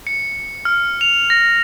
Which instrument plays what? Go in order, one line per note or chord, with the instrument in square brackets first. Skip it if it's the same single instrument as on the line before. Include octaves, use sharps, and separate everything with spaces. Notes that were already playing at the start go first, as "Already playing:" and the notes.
[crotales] C#7
F6
F7
A#6